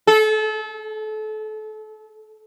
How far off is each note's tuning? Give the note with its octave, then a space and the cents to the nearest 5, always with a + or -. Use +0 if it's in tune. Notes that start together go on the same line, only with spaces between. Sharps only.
A4 -30